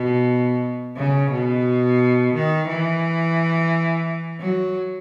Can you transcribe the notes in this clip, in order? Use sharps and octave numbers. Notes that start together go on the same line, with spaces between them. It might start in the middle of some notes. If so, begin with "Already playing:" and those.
Already playing: B2
C#3
B2
D#3
E3
F#3